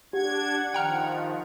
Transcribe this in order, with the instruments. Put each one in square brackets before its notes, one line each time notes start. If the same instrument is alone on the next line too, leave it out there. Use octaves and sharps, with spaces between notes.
[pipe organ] D4 G#6 [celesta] G4 [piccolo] F#5
[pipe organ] D#3 F3 [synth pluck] G5 A#5 F6